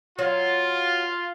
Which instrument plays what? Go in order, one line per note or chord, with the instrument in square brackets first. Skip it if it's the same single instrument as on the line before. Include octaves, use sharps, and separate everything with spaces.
[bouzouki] F#3 [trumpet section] F4